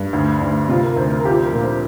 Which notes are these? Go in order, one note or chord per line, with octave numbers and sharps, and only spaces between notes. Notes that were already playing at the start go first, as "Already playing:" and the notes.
Already playing: G2
D2
D2
C3 F4
A#4
D2 C5
A#4
F3 G4
A#4
A#2
C5